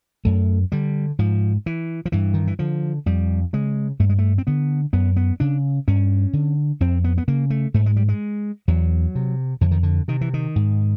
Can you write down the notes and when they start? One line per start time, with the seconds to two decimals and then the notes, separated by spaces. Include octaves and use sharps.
0.25 F#2 A3
0.72 D3 G3
1.19 G#2 F3
1.66 E3
2.06 F3
2.12 G2 E3
2.34 D#3
2.47 E3
2.59 D3 F3
3.06 F2 G3
3.53 C#3 G#3
3.99 G2 A3
4.10 G#3
4.19 A3
4.38 C4
4.47 D3 B3
4.93 F#2 B3
5.16 B3
5.40 C#3 D4
5.88 G2 C#4
6.33 D3
6.80 F2 C4
7.04 B3
7.18 B3
7.28 C#3 A#3
7.50 A3
7.74 G#2 A3
7.86 G#3
7.96 G3
8.09 G#3
8.68 E2 F#3
9.15 C3
9.61 F2 D3
9.71 D#3
9.83 D3
10.08 C3 D#3
10.21 E3
10.34 D#3
10.56 G#2